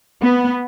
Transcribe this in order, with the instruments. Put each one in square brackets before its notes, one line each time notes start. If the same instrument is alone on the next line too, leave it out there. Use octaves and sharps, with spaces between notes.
[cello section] B3